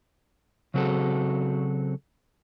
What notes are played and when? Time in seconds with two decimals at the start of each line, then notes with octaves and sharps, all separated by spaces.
0.74 C#3 F#3 C4 F#4 G#4 A4